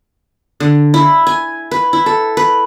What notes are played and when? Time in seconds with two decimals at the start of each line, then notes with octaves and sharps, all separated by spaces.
0.60 D3
0.94 E4
1.27 G#5
1.71 B4
1.93 E4
2.06 A4
2.37 B4